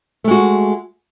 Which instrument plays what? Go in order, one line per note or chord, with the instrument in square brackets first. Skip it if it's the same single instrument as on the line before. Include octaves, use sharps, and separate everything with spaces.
[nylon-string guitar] A3
G#3
F#4